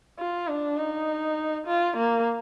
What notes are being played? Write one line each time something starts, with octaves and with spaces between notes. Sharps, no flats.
F4
D4
D#4
F4
A#3